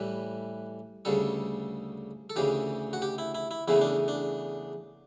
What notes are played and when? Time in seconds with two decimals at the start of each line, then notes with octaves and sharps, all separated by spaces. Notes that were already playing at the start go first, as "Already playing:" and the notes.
Already playing: A2 E3 G3 B4
1.05 D2 C#3 G3 A4
2.30 A4
2.36 D2 C#3 E3 G4
2.93 F#4
3.02 G4
3.18 E4
3.35 E4
3.51 E4
3.68 E2 C#3 E3 A3 E4
3.81 D4
4.08 D4